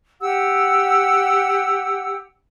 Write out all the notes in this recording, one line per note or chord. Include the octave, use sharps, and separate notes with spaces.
G4 F#5 E6